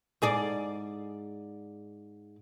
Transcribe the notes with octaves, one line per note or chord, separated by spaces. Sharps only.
G#2 G#4 D5